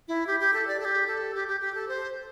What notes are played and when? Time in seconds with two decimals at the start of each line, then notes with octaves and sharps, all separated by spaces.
0.08 E4
0.27 G4
0.40 G4
0.54 A4
0.67 D5
0.80 A4
0.85 G4
1.07 A4
1.35 G4
1.48 G4
1.61 G4
1.75 A4
1.88 C5